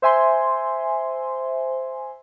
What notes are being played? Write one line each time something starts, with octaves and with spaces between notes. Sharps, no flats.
C5 E5 G#5 C6